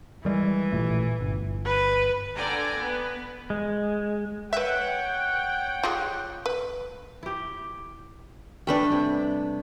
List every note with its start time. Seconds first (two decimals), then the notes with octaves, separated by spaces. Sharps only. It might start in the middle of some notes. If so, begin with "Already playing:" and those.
0.25 D#3 E3 G3 G#3
0.72 A1 A#2 A3
1.20 G1
1.66 B4
2.36 D3 D5 G5 G#5 A#5
2.77 B3 B4
3.50 G#3
4.53 B4 C#5 E5 F#5 G5
5.83 F4 G4 G#4
6.46 B4
7.23 E4 G4
8.67 G3 A3 D4 B4 G5
8.92 C3